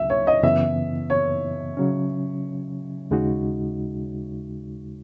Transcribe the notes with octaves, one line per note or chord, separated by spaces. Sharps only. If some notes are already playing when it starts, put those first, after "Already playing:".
Already playing: C#2 C#3 F#3 E5
C#5
D#5
F#2 C#3 E3 B3 E5
C#5
C#3 F#3 C#4
D#2 C#3 G#3 D#4 F#4